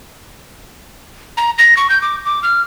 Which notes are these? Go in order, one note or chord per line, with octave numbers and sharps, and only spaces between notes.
A#5
A#6
C#6
G6
D6
D6
F6